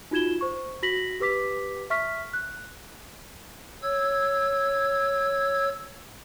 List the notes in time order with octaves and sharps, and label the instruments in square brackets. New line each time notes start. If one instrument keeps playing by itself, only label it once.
[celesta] D#4 F4 F#4 G#6 E7 G7
C5 C#6
F#4 A#6 B6 F#7
G4 B4 D6 B6
E5 C#6 F6 B6
F#6
[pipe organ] C#5 E6 G#6